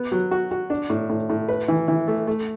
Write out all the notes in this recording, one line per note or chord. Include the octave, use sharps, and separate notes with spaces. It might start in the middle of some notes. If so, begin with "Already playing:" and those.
Already playing: B3
F#3
F#4
F#4
D4
A2
A2
A2
B4
E3
E3
A3
A3